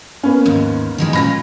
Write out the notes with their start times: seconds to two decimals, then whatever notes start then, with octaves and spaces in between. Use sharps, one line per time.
0.23 A#3 B3 C#4
0.46 D#2 G#2
0.98 D#3 E3 G#3
1.13 A#2 C#4 F4 B5 A#6